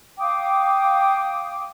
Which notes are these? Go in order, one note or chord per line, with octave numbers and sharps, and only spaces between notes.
F5 G5 D6 D#6